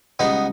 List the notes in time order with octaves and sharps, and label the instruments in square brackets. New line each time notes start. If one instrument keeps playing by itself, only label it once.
[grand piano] C#2 C#3 G3 [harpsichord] B3 D#4